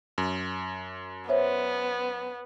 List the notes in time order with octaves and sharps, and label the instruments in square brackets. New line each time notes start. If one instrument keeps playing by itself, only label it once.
[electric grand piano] F#2
[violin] B3 [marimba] C5 C#5 E5